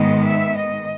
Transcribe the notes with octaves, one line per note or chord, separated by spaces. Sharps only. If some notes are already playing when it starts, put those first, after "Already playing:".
Already playing: G#2 D#3 G#3 B3 D#5
E5
D#5